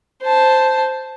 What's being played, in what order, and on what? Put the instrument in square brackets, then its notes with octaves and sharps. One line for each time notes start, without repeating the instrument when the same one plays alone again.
[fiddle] C5 A5